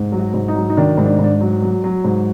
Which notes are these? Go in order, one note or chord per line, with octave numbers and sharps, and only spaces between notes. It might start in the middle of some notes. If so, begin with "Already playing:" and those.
Already playing: G#2
F#3
F#4
G#2
D#4
F#3
D#4
D#3 D4
G#2
D4
G#2 D4
F#3
F#3
F#3
G#2